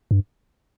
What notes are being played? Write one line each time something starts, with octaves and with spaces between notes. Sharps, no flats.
G2